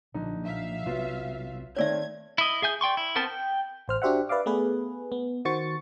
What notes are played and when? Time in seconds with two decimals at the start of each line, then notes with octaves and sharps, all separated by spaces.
0.14 B1 A#2 D3 F3 D#4
0.45 E5 F5
0.86 B1 C3 F#3 B3 F4
1.76 D#3 A3 C4 C#5 D5 E5 G#6
2.38 E4 D#5
2.62 G#4 E5 G#5 G6
2.81 D5 G5 C6 C#6
2.97 E4
3.16 B3 C4 A#4 C5 A5
3.28 G5
3.88 A1 C5 F6
4.02 D4 F#4 G4 C5 E5 F#5
4.29 B4 D5 E5 F5 D6
4.46 A3 B3 G#4 B4
5.12 B3
5.45 D#3 F#4 C5 C#6 A6 C#7